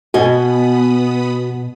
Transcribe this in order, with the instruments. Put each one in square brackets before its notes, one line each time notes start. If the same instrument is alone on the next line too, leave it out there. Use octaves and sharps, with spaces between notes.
[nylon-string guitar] B2 D#5 G#5 [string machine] B3 B5 D#6 [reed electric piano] F#4